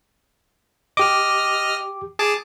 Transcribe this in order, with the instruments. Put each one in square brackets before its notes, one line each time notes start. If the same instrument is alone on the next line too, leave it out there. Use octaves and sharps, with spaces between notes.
[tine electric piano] G4 D6 [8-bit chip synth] D#5 F6
[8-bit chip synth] G#4 A5 D6